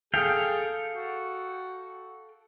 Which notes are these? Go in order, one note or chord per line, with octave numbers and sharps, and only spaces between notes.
G#4 A4 F5 G5
F#4